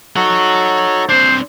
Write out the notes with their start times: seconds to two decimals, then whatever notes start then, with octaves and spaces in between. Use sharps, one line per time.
0.16 D#4 F#4 A4 C#5 F#5
1.09 C4 D4 C5